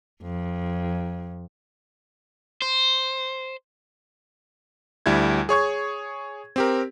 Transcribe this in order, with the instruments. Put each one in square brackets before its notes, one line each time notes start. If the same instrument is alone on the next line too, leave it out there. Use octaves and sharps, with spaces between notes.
[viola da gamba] F2
[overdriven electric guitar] C5
[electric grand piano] D2 G3 E4 G#6
G#4 C#5 C#6 G#6
C4 G4 A#4